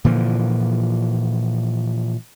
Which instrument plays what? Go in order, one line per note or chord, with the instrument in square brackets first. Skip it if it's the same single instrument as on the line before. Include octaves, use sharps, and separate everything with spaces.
[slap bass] A#2 D3 E3 F3